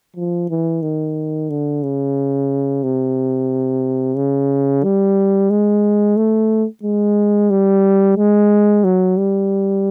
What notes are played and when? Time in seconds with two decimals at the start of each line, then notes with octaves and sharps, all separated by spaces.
0.16 F3
0.50 E3
0.82 D#3
1.50 D3
1.83 C#3
2.83 C3
4.16 C#3
4.84 G3
5.50 G#3
6.17 A3
6.83 G#3
7.50 G3
8.17 G#3
8.84 F#3
9.17 G3